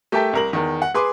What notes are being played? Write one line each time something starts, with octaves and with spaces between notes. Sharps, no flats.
A3 G4 A#4 E5 G5 A5
C2 A#4 F#7
E2 D#3
F#5
G#4 B4 C6 D6